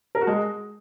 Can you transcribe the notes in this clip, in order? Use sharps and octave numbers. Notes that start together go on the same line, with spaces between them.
A#4
F#4
G#3